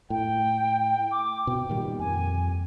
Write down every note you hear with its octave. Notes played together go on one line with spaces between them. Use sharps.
A2 G5
D6
B2 G5
A#2 D#3 G3
F2 G#5